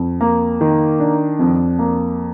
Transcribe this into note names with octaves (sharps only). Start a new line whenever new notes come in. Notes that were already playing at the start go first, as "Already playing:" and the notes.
Already playing: F2
A#3
D#3
D4
F2
A#3